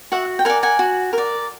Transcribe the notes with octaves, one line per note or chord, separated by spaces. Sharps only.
F#4 E5 F#5
G5
A#4 D5 F#5 G#5
F#5 G#5
F#4
A#4 D5